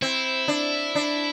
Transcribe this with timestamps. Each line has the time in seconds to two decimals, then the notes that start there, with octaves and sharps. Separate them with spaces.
0.02 C4 E4
0.48 D4
0.95 D4